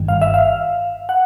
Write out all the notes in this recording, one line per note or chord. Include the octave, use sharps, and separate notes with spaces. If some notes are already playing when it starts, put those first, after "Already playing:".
Already playing: G1 G2 D#3 G3
F5
E5
F5
F#5